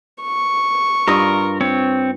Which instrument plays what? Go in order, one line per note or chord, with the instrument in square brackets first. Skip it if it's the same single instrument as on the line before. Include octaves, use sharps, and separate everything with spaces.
[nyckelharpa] C#6
[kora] G2 F4 D#5 [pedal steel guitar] A#4
[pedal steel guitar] C4 C#5